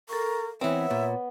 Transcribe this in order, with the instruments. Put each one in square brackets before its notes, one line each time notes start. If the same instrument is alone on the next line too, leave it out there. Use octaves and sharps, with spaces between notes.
[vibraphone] A4 C#6 [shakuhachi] A#4
[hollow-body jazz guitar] E3 C4 [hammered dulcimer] B3 [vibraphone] C#5 [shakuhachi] E5
[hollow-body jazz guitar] A#2